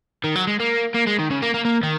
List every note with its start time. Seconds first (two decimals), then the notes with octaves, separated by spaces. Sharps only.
0.24 D#3
0.36 F#3
0.47 G#3
0.60 A#3
0.94 A#3
1.07 G#3
1.19 D#3
1.30 C#3
1.42 A#3
1.54 A#3
1.65 A#3
1.83 D#3